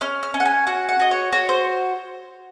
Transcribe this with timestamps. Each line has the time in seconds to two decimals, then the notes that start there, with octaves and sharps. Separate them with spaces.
0.01 C#4 F6
0.23 F6
0.34 C#4
0.40 F#5
0.45 G#5
0.67 F#4 F#5
0.89 F#5
1.00 F#4 D#5
1.11 C#5
1.32 F#4 C#5
1.49 C5